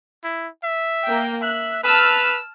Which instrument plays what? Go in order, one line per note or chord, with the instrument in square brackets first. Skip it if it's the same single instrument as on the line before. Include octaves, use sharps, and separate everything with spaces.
[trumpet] E4
E5
[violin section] A#3 G5
[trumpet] E5 [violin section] F#6
[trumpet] B4 [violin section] A5 E6 F6